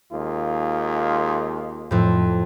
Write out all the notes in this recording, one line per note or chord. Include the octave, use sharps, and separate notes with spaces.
D#2 G#3 F4
F2 A2